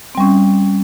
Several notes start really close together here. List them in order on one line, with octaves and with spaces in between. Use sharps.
C4 G3 C#4